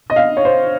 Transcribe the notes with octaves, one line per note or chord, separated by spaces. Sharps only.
D#5
F5
C#5
C5